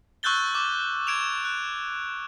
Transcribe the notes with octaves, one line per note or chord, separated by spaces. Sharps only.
C#6 E6 F#6 G6 A6 G7
D6
G#6 D7 E7 F7
F#6